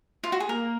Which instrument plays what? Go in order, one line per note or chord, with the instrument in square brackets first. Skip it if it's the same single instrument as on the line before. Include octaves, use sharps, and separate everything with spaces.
[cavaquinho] F4
F#4
G#4
[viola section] A#3 [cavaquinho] A#4